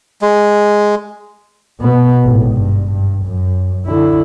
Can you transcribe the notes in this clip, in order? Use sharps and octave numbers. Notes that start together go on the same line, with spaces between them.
G#3
B2 B3
G#1 A2
G2
G2
F#2
D3 E4